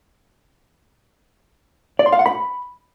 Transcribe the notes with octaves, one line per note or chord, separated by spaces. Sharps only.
D5
C6
F5
F#5
B5